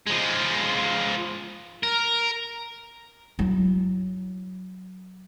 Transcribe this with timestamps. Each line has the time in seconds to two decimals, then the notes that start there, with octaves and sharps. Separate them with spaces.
0.07 F3 G#3
1.83 A#4
3.39 F#3 E4